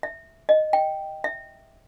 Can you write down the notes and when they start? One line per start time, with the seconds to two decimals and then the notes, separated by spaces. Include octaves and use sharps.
0.03 E5
0.49 D#5
0.73 G5
1.24 E5